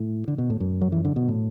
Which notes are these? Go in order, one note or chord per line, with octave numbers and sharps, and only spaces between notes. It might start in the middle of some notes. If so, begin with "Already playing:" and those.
Already playing: A2
D3
B2
A2
F#2
F#3
E3
D3
B2
A2